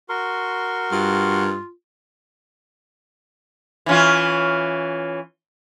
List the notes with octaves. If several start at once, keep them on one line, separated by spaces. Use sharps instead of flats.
F#4 A#4 C6 C#6
G2 F4
E3 C#4 F4